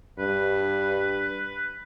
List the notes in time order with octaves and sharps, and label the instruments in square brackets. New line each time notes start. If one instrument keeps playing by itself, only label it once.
[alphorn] G2 [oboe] B4